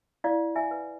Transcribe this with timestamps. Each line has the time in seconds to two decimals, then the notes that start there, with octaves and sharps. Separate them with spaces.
0.24 E4 D5 F5
0.56 E5 G#5
0.71 B4